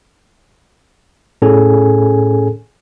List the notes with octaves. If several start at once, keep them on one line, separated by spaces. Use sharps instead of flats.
A2 C#4 G#4 A4 G#5